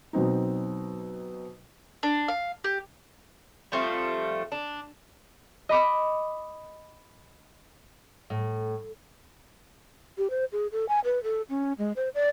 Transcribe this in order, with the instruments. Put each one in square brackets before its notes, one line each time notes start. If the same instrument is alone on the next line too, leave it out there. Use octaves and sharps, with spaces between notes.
[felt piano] B2 F#3 C4 D#4
[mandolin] D4
F5
G4
[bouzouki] F3 G3 A3 C4
D4
[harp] D#5 B5 D6
[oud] A2
[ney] G4
C5
G#4
A4
G#5
B4
A4
C#4
G#3
C5
D5